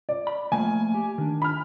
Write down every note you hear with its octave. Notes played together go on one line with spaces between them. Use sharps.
D5
B5
F3 A3 A#3 G#5
G4
D#3 D4
B5 F6